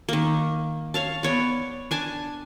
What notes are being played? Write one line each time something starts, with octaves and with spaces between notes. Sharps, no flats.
D#3 A#3
C#5 F5 A5
B3 C#5 D5
D4 G#5 A5